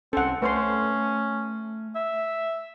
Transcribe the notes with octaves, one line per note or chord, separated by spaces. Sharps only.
C2 C4 C#4 A4 F#5
A3 C#4 B4 C5 C6
E5